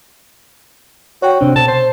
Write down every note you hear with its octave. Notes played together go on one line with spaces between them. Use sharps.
F#4 C#5 G5
C3 C4 D4
B2 A5
C5